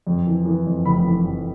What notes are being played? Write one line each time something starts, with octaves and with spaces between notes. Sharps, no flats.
F2
E3
E3
F2
F1 B5
E3
F2